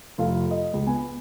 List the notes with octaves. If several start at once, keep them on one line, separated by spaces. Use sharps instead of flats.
F1 F4 A4 F5
D#5
C#2
B3 G#5